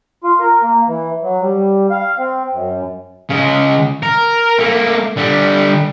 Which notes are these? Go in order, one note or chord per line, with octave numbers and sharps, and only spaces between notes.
F4
A#4
A#3
E3
F#3
G3
F5
C4
F#2
C#3 G#3
A#4
A3 A#3
D3 G3